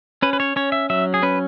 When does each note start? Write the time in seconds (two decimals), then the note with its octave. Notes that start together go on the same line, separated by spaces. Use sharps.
0.22 C#4 B4
0.33 B4
0.40 C#5
0.56 C#4 C#5
0.72 E5
0.90 F#3 E5
1.14 G#4
1.23 C#4 B4